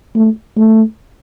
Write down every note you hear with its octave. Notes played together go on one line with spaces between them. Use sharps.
A3
A3